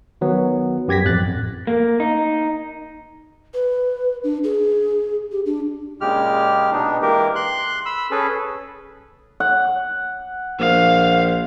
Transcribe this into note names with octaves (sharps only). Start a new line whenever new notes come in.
D#3 F#3 B3
F#2 G4 G#6 A#6 B6
A1 F2 F#6 A6
A#3
D#4
B4
D4
G#4
G4
D4
A#2 C#3 G#3 G4 F6
B2 B3 D4 D#4
E3 G#3 A#3 G4 A#4
C6 F#6
B5 E6
C#4 G#4 A4 B4
F#5
A#1 F5